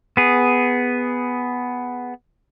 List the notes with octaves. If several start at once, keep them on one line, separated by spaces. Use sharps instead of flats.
B3 G#4